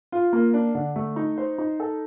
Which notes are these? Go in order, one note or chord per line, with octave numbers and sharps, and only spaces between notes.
F4
A#3
D4
D3
A3
D#4
C5
D#4
A4